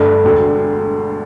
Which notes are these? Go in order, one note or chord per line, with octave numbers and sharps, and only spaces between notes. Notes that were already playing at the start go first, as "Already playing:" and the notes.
Already playing: G1 G2 D3 A3
E1 D2 D3